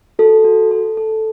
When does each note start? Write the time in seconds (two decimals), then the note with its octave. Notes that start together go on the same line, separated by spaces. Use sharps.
0.19 F#4 A4
0.45 F#4
0.71 A4
0.97 A4